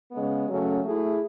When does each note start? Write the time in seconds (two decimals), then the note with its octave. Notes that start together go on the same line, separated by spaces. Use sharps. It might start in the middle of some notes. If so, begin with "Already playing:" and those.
0.11 C#3 G#3 B3
0.47 C#3 F#3 A3 C#4
0.83 A3 E4 G#4